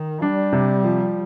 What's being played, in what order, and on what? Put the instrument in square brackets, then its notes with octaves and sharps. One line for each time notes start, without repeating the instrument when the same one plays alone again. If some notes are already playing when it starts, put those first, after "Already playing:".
Already playing: [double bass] D#3
[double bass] G3 [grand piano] D4
[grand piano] C3
F3